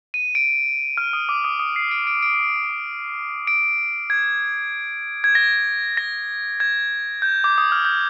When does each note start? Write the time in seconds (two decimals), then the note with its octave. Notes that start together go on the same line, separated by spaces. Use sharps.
0.14 D#7
0.35 D7
0.97 F6
1.13 D#6
1.29 D6
1.44 D#6
1.60 D#6
1.76 C7
1.91 D7
2.07 D7
2.23 D7
3.47 D7
4.10 G#6
5.24 G#6
5.35 A#6
5.97 A#6
6.60 G#6
7.22 G6
7.44 D6
7.58 D#6
7.72 F6
7.85 G6